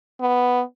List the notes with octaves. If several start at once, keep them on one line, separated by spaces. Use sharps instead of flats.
B3